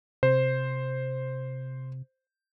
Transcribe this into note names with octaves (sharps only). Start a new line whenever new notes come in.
C3 C5